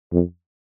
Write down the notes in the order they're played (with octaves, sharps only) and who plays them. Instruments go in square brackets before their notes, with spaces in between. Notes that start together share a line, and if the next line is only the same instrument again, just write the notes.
[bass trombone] F2